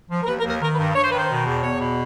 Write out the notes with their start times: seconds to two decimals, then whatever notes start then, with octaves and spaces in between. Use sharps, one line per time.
0.10 F3
0.23 A#4
0.27 D#2 B4
0.39 A#4
0.43 D#2
0.49 A#4
0.61 D#3 A#4
0.73 B4
0.78 G2
0.95 G2 C#5
1.02 C5
1.10 D#3 B4
1.18 C5
1.29 B2
1.46 E2
1.63 E2 C#5
1.80 B2